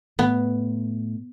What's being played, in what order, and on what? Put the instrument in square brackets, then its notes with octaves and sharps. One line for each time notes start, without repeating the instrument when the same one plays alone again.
[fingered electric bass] A2 [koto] B3